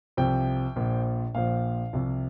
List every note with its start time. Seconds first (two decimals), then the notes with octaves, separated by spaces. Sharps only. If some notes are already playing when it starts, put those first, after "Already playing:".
0.17 C2 C3 F3 G5
0.76 A#1 A#2 F3
1.34 A#1 A#2 F3 F5
1.93 C2 C3 F3